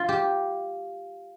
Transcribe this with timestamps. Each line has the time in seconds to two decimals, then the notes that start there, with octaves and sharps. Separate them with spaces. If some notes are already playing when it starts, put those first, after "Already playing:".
Already playing: F4
0.09 G4